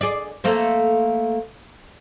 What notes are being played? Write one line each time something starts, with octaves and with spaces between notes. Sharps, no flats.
G#4 D5
A3 A#3 C4